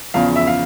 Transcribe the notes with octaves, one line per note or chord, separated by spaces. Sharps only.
E2 C#3 F3 F5
E5
F5